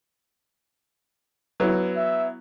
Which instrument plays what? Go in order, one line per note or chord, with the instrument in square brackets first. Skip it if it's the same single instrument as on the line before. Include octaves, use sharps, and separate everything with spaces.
[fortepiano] F#3 B3 E4
[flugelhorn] E5